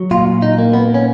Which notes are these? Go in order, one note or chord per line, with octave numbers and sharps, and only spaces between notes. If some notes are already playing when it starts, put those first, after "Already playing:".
Already playing: F#3
A#2 F4
D#4
A#3
B3
C#4